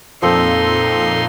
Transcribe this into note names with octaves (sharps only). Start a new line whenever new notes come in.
F2 A#2 F3 C4 D#4 A4 C6 E6